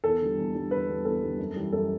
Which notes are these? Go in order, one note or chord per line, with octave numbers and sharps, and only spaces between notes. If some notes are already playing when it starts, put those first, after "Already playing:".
E2 A4
D3 G3
E2
D3 G3
E2 B4
D3 G3
E2 A4
D3 G3
F#2
E3 G3
F#2 A4